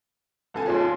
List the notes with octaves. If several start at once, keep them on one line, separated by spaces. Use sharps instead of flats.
C2 A4 G#5
D#2 C#4 F4 G#4